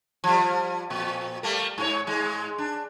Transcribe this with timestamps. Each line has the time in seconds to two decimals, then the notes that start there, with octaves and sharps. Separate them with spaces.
0.24 F3 G3
0.90 F2 A#2
1.43 G3 A3 A#3
1.78 G#2 C4 C#5
2.07 G#2 G#3
2.58 D4